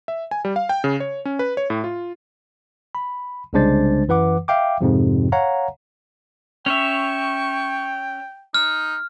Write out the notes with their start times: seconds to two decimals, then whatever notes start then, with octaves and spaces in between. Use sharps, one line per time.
0.08 E5
0.31 G#5
0.45 G3
0.56 F5
0.69 G5
0.84 C#3
1.00 C#5
1.25 C#4
1.39 B4
1.57 C#5
1.70 A2
1.84 F4
2.95 B5
3.53 C2 C#3 G#3 D4 C5 A6
4.08 F#2 E3 B4 F#5 D6
4.48 E5 F5 G5 D6
4.81 F2 G#2 C3 F3
5.32 C#5 F5 F#5 A#5
6.66 C#4 C#5 E5 G5 C#6
8.54 D#4 F6